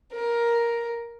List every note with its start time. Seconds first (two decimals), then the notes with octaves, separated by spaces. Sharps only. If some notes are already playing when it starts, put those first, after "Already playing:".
0.14 A#4